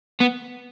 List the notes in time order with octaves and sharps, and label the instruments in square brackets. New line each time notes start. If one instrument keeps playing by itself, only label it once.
[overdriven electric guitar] B3